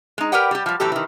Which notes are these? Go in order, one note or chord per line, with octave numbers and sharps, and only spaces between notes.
G#3 D#4
G4 A#4 B4 D5 F#5 G5
G3 G4
F3 G3
A2 E3 F#3 G4 A4
D#3 E3